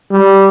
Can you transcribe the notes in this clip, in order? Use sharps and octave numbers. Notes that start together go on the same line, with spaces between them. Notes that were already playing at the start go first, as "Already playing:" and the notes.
G3